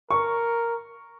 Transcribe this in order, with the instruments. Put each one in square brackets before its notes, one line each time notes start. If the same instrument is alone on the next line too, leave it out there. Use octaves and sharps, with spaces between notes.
[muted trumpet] A#4 [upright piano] C#6